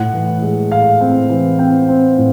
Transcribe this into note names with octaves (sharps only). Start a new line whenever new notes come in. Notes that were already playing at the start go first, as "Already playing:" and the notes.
Already playing: A2 F#5
E3
G#3
A2 F5
C4
E3
C4 G5
C4
A2